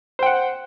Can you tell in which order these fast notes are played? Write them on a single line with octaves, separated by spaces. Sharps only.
C5 G5 F#5